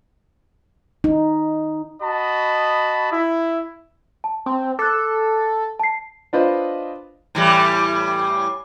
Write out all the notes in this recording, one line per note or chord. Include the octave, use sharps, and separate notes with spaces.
D#4
F#4 D#5 A5 B5
E4
A5
C4
A4 D6 F#6
A5 C7
D4 F4 B4 C5 D#5
A2 E3 G3